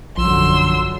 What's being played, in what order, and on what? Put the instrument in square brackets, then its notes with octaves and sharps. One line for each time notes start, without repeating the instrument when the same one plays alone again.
[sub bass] A#1 [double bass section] F#2 D3 F#3 [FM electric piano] F3 [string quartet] C6 E6